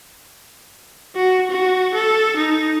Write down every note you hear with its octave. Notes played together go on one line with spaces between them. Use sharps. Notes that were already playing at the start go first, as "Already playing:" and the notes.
F#4
F#4
A4
D#4